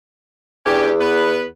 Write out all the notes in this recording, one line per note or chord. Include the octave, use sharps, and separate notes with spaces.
E2 C#4 D4 G4
B3 B4